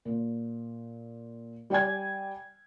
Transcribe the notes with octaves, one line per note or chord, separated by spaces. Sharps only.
A#2
G3 D5 G5 G#5 G#6